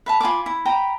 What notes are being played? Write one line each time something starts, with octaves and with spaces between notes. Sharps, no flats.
B4 E5 A5
F4 G#5 B5 D6
E4
G5 A#5 B5